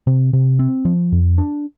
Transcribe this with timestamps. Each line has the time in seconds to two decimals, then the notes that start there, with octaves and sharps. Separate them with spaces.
0.07 C3
0.33 C3
0.59 C4
0.85 F3
1.12 F2
1.38 D4